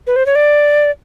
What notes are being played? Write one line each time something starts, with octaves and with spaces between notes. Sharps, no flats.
B4
C5
C#5
D5